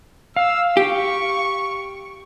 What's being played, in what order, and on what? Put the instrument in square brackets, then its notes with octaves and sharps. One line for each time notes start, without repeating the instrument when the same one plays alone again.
[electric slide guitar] F5 [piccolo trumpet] E6
[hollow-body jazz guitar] G4 [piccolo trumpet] C#6